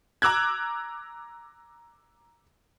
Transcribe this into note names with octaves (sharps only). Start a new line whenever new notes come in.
A#5 D6 E6 F#6 G#6